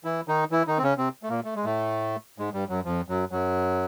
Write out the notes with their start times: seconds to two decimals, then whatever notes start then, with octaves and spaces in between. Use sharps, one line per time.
0.04 E3 E4
0.28 D#3 D#4
0.51 E3 E4
0.67 D#3 D#4
0.78 C4
0.82 C#3 C#4
0.98 C3 C4
1.23 A3
1.29 A#2 A#3
1.44 A3
1.55 G#3
1.64 A2 A3
2.38 G#2 G#3
2.53 G2 G3
2.69 F#2 F#3
2.85 F2 F3
3.08 F#2 F#3
3.31 F#2 F#3